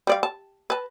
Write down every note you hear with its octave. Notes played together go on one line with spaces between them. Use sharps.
G3 D5 F5
A5
B4 A5